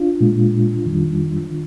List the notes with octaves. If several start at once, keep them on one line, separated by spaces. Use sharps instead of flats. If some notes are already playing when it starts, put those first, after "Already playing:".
Already playing: D4 F4
A#2 G#3
F2 D#3 G3
D#3